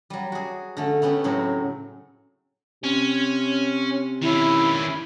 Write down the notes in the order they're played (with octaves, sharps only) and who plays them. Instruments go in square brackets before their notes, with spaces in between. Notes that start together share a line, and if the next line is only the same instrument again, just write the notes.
[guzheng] F#3 G3
F#4 G#4
D3 A3 C#4
A3 B3 C#4 D4 G4
A2 C#3 F#3 C4
[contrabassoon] C3 [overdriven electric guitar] C#4
[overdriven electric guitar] D#3 C#4 [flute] E4